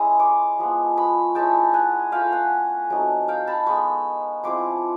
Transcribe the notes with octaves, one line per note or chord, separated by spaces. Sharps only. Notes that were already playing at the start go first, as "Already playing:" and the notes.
Already playing: G#3 C#4 E4 C#6 D#6
C6 D6
F3 G#3 B3
B5 C#6
G#3 C#4 E4 G5 A5
F#5 G#5
A3 C#4 F4 F5 G5
F#5 G#5
F#3 A3 C4 D#4
F5 G5
A5 B5
G#3 B3 D#4 B5 C#6
F3 G#3 C4 E4 C6 D6